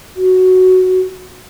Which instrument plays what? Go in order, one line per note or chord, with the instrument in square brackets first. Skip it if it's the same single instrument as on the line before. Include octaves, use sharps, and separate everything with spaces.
[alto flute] F#4